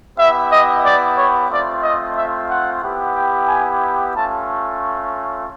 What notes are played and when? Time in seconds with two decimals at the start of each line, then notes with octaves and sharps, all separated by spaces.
0.19 B3 E4 G4 E5
0.52 D#5
0.85 D5
1.18 C#5
1.50 A3 C4 F4 D5
1.83 D#5
2.17 E5
2.50 F#5
2.83 B3 E4 G4
3.16 G5
3.48 G#5
4.14 A3 C#4 F4 A5